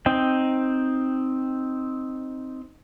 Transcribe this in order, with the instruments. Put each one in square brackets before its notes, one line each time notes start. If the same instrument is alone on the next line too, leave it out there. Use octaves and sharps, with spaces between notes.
[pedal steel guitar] C4 D#4 G5